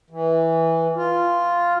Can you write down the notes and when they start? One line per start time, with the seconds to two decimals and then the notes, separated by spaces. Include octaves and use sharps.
0.10 E3
0.96 F4